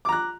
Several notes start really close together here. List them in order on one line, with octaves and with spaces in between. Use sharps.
D6 A#5 F#6